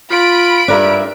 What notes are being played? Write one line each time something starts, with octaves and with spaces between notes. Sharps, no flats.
F4 B5 D7
G2 D4 A#4 E5